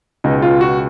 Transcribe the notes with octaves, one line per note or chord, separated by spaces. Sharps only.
C#2 B2 G#3 D#4
F4
F#4